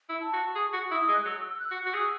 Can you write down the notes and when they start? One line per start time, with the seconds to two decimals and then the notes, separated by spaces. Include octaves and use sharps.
0.09 E4
0.21 A5
0.33 F#4
0.56 G#4 C#6
0.64 D#6
0.72 F#4 C#6
0.90 E4 D#6
1.08 G#3
1.14 F#6
1.25 F#3 E6
1.48 E6
1.60 F#6
1.71 F#4
1.84 F#4 F#6
1.94 G#4 E6